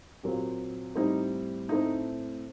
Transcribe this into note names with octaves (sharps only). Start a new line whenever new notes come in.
A#2 F#3 C4 G4
A2 G3 C4 D#4
A2 A3 C4 D#4